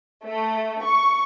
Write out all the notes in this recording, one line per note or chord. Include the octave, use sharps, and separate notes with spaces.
A3
C#6